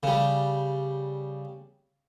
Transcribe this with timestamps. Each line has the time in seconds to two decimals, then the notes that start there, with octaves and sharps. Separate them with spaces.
0.03 C#3 G3